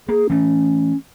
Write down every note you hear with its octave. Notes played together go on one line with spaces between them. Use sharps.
A#3 G#4
E3 A3 C#4